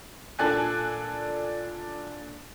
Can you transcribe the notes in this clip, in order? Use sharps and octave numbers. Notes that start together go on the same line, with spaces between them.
A#2 D4 A4 D5 G#5 F#6